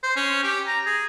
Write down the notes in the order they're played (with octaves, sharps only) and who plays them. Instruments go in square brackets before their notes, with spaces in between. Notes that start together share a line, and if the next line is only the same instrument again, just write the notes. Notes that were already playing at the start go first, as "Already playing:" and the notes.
[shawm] C5
C#4
G4
A#5
G#4